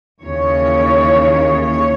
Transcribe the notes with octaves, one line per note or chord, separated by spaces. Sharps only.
D#2 C#3 E3 C#5
C#5